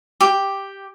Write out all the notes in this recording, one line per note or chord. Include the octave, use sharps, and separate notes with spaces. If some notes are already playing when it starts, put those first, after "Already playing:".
G4